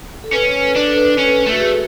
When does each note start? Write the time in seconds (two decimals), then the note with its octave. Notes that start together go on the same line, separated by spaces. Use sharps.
0.24 A4
0.33 C#4 B4
0.75 D4 B4
0.87 A4
0.98 B4
1.18 C#4 A4
1.46 A3
1.52 F#4
1.60 G#4